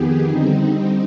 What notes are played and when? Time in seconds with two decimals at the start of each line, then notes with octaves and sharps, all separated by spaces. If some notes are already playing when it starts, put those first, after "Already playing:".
Already playing: F2 D#3 B3 G4 G#4
0.26 D3 G3 C4 D#4